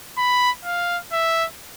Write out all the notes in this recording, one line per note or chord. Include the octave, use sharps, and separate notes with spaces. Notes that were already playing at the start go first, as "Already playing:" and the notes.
B5
F5
E5